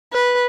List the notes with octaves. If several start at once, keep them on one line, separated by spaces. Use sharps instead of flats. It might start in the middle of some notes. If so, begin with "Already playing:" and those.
B4